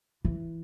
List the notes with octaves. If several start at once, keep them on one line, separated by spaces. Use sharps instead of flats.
E3